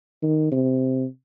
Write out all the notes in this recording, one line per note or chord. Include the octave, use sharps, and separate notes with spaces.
D#3
C3